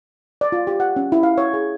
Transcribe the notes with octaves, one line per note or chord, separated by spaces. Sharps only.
D5
F4
G4
F#5
C#4
E4
F5
C#5
G#4